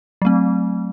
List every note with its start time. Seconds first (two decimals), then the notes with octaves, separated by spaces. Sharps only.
0.22 F#3 A3 C4